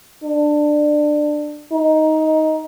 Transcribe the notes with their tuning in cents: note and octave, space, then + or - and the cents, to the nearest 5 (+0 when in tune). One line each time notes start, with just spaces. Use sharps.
D4 +20
D#4 +10